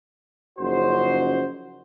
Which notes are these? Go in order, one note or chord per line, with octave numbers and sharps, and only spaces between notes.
F#1 C#3 F3 D#4 F#4 C5